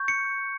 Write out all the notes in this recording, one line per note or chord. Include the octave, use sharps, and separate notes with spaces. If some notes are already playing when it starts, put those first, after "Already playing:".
Already playing: C#6 G6
C#7